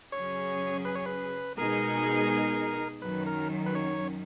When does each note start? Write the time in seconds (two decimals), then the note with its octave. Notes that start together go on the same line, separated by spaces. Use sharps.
0.12 F#2 C#3 F#3 C#4 G#4 C#5
0.85 B4
0.95 C#5
1.06 B4
1.58 B2 G#3 D#4 G#4 A#4
3.02 F#2 D#3 F#3 C#4 B4
3.26 A#4
3.66 B4
3.75 C#5